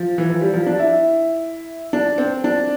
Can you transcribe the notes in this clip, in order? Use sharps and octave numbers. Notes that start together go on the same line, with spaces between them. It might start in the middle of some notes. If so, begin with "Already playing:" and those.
Already playing: F3
E3
F3
G3
F3
D4
E4
D4
C4
D4